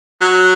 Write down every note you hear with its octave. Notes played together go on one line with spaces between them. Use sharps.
F#3